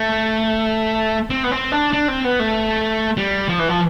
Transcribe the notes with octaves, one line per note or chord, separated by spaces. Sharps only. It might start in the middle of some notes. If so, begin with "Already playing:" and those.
Already playing: A3
C4
B3
C4
D4
D4
C4
B3
A3
G3
F3
E3
F3